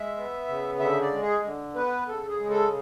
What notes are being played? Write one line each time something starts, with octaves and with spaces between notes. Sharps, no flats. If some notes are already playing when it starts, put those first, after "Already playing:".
Already playing: G#3 E5
B3
C#3
D3 E5
D5
G#3
G#4
D3
B3 B4
C#3 A4
G#4
G#3
A4